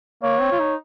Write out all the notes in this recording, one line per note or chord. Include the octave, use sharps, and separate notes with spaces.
A#3 C#5
C4
F4
D#4